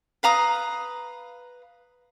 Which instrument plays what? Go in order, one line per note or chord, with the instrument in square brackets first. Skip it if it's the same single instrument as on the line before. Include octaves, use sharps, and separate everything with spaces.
[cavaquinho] B4 F5 A#5 D#6